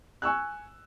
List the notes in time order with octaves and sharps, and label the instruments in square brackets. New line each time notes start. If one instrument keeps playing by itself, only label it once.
[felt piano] G#5 C#6 E6 F#6